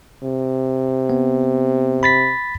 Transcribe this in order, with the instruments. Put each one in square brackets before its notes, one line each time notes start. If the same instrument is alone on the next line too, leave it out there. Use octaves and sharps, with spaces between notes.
[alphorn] C3
[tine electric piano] B3
B5 A6 B6